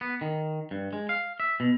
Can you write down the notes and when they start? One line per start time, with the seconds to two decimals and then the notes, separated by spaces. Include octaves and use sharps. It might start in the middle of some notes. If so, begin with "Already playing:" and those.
0.01 B3
0.21 D#3
0.71 G2
0.93 G#3
1.09 F5
1.40 E5
1.60 B2